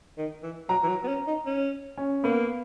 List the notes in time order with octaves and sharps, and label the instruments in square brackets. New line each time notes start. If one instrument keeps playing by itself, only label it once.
[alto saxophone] D#3
E3
[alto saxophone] F#3 [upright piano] A#5
[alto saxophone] E3
F#3
B3
C#4
D#4
C#4
[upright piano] C#4
[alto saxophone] A#3 [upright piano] B3